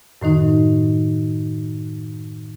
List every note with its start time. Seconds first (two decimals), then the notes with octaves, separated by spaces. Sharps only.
0.21 F#2 A2 D#3 D#4